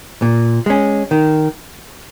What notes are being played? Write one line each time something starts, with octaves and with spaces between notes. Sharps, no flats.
A#2
G#3 C#4
D#3